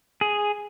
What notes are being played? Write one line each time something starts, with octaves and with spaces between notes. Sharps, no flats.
G#4